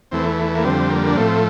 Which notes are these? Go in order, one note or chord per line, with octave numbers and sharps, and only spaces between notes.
E2 E3 A3 C4
A#3
F2 D3 G3 C4
A#3
D4
A2 F3 A3 C4